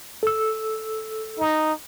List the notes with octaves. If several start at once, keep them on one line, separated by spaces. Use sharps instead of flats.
A4 E6
D#4